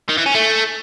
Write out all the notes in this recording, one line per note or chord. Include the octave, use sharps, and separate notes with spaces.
D#3
E3
C#4
A3